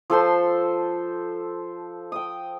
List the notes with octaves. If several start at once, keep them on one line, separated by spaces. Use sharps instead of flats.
F3 A4 C5 C6
G5 D#6